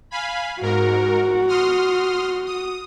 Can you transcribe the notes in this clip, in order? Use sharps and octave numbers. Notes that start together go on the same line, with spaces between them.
F5 G#5 B5
G#2 F#4 A#4
C6 D#6 F6
D#6